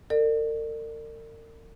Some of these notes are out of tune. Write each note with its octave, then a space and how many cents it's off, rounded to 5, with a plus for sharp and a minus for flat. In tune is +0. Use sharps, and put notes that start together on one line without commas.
A#4 -45 D5 +35